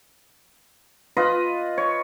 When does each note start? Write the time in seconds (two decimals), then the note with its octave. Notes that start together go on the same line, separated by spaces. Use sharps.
1.17 F4 B4 D#5
1.78 C#5